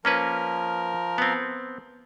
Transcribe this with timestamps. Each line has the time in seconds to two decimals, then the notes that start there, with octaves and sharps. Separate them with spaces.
0.05 F3 A#3 C#4 A#4 B4
1.18 B3 C4